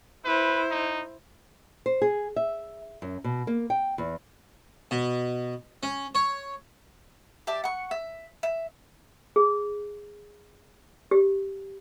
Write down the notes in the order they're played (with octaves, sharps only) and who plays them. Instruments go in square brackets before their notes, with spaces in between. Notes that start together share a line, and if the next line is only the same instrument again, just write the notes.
[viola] E4 C5 [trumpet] B4
[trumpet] D#4
[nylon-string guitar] C5
G#4
E5
F#2
B2
A#3
G5
E2
[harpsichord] B2
C#4
C#5
[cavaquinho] G4 D5 E5 A5
F#5 C#6
E5
E5
[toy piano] G#4
G4